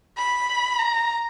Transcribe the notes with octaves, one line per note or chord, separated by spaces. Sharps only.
B5
A#5